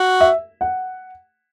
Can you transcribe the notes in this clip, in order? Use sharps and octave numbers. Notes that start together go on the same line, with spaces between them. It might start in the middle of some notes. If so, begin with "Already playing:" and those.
Already playing: F#4
E5
F#5